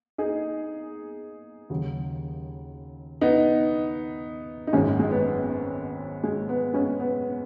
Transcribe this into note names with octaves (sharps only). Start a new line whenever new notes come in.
D#4 G#4
D#2 C#3 F#3
B3 D#4
D#4
G#1 F#2 F#3 G#3 C#4
G#3
B3
G#3
B3
G#3 C#4
B3